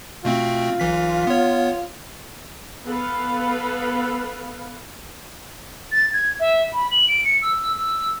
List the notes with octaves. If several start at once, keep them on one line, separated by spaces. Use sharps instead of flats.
B2 A3 C4 F4
B1 E3 B6
B3 C#5
B3 A4 B4 F5
A6
G#6
E5
B5
F#7
D7
C#7
E6
E6